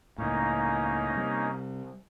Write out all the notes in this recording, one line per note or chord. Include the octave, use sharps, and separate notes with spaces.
C#2 A2 A#3 C#4 D#4
C3 G3